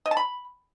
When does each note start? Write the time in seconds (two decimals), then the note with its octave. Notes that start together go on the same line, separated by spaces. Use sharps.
0.06 D#5
0.11 A5
0.17 B5